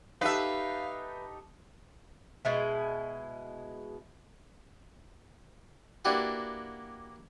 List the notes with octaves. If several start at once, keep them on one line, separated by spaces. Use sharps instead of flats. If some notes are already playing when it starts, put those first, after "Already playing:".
D#4 G4 A4 B4 E5 F5
B2 G#3 E4
A#3 D4 E4 F#4 G4 B4